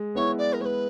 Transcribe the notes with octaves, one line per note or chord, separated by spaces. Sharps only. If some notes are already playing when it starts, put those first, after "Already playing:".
Already playing: G#3
B3 E4 C#5
D5
A#4
G#3 B4 C#5